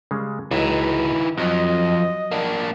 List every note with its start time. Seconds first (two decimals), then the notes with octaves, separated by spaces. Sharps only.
0.11 C#3 G3 G#3
0.51 C#2 E3 D#4 E4 F#4
1.38 F2 F3 F#3 D#5
2.31 A#3 D4